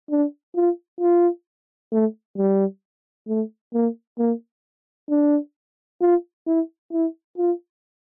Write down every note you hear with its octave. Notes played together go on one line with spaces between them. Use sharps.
D4
F4
F4
A3
G3
A3
A#3
A#3
D4
F4
E4
E4
F4